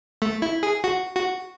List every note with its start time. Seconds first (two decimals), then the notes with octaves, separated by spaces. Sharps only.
0.22 A3
0.42 E4
0.63 G#4
0.84 F#4
1.16 F#4